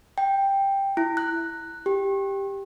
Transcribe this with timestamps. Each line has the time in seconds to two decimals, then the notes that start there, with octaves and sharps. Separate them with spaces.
0.18 G5
0.97 E4
1.17 F#6
1.86 G4